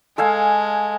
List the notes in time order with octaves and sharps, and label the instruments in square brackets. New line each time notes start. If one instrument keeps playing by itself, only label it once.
[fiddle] G#3 [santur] A4 F5 G#5